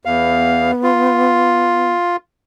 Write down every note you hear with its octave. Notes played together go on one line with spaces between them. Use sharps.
E2 B3 F5
F4